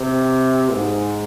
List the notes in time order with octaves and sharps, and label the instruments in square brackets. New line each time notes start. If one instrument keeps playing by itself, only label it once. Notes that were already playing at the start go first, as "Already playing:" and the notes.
Already playing: [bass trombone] C3
G#2